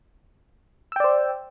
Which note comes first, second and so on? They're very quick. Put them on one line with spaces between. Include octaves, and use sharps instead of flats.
E6 G5 D5 C5